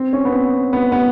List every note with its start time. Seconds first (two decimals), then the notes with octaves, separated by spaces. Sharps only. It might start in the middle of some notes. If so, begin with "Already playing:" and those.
Already playing: C4
0.13 C#4
0.25 B3
0.33 C4
0.73 B3
0.92 B3